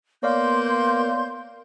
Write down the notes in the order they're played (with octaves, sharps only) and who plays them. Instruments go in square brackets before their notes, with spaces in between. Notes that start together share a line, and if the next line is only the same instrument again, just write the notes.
[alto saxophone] A#3 [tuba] B3 [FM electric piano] C#5 D5 F5 [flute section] C6 G6